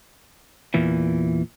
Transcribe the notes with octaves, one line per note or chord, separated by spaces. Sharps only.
E2 A#2 E3